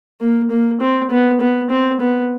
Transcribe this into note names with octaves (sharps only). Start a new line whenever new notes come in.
A#3
A#3
C4
B3
B3
C4
B3